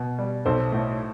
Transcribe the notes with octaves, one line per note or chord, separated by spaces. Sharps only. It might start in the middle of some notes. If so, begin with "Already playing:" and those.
Already playing: B2
G3
B1 A4 C5
A2